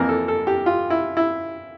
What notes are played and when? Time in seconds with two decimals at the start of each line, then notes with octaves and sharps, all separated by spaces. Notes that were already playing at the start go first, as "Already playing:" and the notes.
Already playing: F2 E3 A#3 A#4
0.09 A4
0.28 A4
0.47 G4
0.66 F4
0.90 E4
1.17 E4